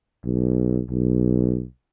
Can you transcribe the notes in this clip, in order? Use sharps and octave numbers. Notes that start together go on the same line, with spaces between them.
B1
B1